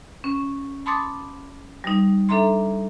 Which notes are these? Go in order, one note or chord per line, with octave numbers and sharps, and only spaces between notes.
C#4
A5 B5 C6 D6 D#6 A6
G3 D#4
D4 A4 E5 A#5 C6